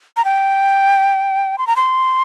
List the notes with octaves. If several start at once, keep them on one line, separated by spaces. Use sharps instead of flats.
A#5
G5
C6
A#5
C6